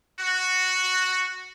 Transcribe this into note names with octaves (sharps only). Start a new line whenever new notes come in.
F#4